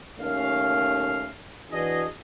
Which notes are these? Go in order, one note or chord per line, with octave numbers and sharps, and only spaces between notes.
D#2 A3 C#4 F5
E3 D4 F#4 G#4 D#5